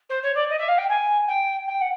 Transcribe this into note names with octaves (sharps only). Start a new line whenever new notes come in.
C5
C#5
D5
D#5
E5
F5
G5
G#5
G5
G5
F#5